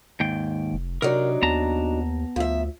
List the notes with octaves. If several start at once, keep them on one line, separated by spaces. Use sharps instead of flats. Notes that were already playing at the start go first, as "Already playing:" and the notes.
D#2 G#2 G5
F1
C3 F#3 D4 D#4 A#4
D#2 B3 A5 A#5
D2 F3 E5